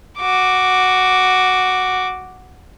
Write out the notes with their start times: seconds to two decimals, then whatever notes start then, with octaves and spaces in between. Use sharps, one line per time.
0.19 F#4 D6